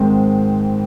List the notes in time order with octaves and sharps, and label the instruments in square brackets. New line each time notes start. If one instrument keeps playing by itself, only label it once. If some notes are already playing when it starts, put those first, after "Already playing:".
Already playing: [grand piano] G#1 G#2 D#3 G#3 C4